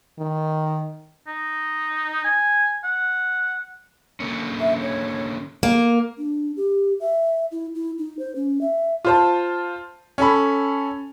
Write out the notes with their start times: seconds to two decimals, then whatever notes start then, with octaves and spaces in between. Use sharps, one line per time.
0.19 D#3
1.27 D#4
2.25 G#5
2.84 F#5
4.20 D3 A#3 C#4
4.60 E5
4.81 C#5
5.63 A#3
6.18 D4
6.57 G4
7.00 E5
7.52 E4
7.75 E4
7.98 D#4
8.19 C5
8.36 C#4
8.61 E5
9.05 F4 C5 A5
10.18 C#4 A4 B5